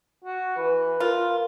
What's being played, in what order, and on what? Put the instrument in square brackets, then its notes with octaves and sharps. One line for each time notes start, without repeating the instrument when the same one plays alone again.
[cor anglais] F#4
[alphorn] E3 [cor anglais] B4
[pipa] F4 [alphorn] A#4